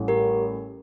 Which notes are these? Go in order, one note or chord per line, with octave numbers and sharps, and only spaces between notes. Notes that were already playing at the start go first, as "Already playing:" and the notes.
Already playing: A1 A2 G3
G4 A#4